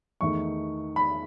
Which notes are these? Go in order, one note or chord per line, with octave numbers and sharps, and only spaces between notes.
E2 D#3 A3 C#6
B5